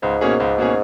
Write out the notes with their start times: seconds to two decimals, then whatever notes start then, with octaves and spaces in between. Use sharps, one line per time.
0.02 C#2 G#2
0.21 B2 A#3 C#4 G#4
0.40 C#2
0.58 B2 A#3 C#4 G#4